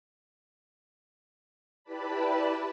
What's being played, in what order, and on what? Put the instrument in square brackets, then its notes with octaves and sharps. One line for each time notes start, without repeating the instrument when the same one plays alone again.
[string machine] E4 G4 B4 D5 A5 B5